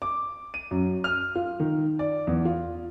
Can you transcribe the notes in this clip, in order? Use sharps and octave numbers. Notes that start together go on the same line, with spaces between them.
D6
D#7
F#2
F6
F4
D#3
D5
E2
F4